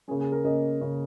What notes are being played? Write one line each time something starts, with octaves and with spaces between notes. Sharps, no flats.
C#3 A#3 C#4 G#4
G#4
A#4
C#3 A#3 C#4 D#5
C#3 A#3 C#4